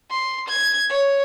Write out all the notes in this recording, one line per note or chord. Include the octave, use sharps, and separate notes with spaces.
C6
G#6
C#5